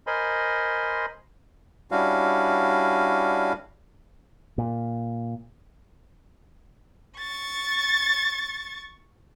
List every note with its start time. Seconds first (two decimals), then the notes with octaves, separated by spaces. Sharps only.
0.07 A#4 C5 D#5 G#5 B5 C6
1.91 G3 C#4 D4 E4 F#4 F5
4.58 A#2
7.18 C#6 A6